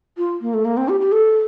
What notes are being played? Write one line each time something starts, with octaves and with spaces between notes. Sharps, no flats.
F4
A#3
A3
A#3
C4
G4
G4
A4